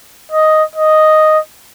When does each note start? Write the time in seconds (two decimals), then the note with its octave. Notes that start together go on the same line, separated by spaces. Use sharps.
0.32 D#5
0.76 D#5